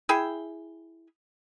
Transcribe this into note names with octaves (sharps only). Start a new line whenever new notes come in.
E4 G#4 E5 G5